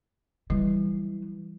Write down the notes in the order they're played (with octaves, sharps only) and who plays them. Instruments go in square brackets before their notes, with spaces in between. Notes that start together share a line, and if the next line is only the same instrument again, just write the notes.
[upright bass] E3 F#3 [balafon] G3